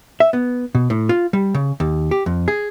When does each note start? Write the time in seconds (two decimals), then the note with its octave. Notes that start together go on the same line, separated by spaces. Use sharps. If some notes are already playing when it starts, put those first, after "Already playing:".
0.20 E5
0.33 B3
0.75 B2
0.90 A2
1.09 F4
1.33 G3
1.54 C#3
1.80 D#2
2.11 G4
2.26 F2
2.48 G#4